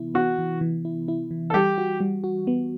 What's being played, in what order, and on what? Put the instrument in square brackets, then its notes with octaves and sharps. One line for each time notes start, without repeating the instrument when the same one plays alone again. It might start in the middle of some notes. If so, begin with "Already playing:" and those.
Already playing: [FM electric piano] C3 E3 B3 E4
[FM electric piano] B3 [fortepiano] F#4
[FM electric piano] E3
E3
E4
E4
E3
[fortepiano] A4
[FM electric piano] G3 [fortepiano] G4
[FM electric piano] F#4
G3
F#4
B3